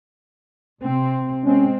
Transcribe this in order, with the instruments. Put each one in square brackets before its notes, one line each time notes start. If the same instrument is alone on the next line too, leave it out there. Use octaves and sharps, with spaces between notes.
[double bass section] C3 C4
[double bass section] G#3 C4 [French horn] C#4